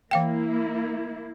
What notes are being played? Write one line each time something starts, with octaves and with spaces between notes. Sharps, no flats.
E3 A#3 E4 F5 G5